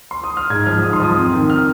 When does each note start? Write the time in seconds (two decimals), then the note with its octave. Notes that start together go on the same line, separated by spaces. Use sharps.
0.11 C6
0.24 D#6
0.37 F6
0.50 G#2 G#6
0.67 F3 F6
0.83 G#2 D#6
0.93 C6
1.00 F3 D#6
1.16 F2
1.33 D#3
1.50 F6